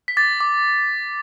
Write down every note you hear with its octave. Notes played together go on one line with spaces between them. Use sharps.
B6
D6 A6
D6